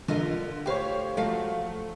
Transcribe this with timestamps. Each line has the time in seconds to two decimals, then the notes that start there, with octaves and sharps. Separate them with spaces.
0.08 D3 F4 A#4 D#5
0.66 D2 G4 C5 C#5 F5
1.17 F3 F#3 A3 F5